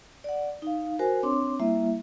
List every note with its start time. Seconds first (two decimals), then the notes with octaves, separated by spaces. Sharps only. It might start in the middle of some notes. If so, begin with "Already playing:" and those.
0.24 D5 F#5
0.62 D#4 F5
0.99 F#4 A#4 C5 G#5
1.23 C4 D4 C#5 C6 D6
1.60 G3 A#3 E4 E5